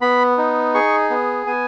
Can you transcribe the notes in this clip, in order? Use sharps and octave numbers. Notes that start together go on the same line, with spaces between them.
B3 B5
D#4
G#4 C#6
B3
B3 G#5